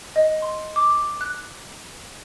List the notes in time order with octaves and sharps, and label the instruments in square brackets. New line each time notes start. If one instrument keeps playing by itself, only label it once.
[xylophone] D#5
C6
D6
F#6